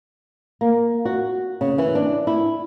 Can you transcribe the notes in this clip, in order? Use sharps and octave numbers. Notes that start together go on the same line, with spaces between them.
A#3
F#4
C#3
E3
D4
E4